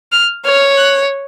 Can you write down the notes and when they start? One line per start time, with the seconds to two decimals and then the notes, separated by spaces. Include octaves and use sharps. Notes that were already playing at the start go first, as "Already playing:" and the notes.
0.12 F6
0.45 C#5 F6
0.77 F#6